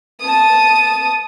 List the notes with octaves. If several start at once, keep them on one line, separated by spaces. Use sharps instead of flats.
A5 D#6